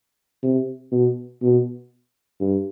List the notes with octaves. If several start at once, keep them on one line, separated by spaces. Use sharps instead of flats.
C3
B2
B2
G2